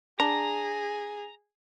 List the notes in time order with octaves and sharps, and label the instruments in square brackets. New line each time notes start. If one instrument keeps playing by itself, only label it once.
[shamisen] D4 [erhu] G#4 [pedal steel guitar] A#5